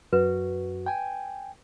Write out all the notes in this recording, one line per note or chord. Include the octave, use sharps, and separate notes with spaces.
F#2 F#4 B4
G5 G#5